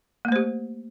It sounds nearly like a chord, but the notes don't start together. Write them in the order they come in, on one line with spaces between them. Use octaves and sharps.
A#3 A3 C5 G4